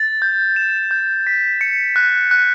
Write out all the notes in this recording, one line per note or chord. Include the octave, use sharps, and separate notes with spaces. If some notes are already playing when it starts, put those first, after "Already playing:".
Already playing: A6
G6
E7
G6
B6
C#7
F#6
F#6